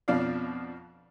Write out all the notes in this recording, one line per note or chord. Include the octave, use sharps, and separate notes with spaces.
F2 B2 F3 D4 D5 F5